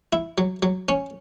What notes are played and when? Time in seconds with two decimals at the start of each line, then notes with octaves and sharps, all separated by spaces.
0.13 E4
0.38 F#3
0.63 F#3
0.88 C#4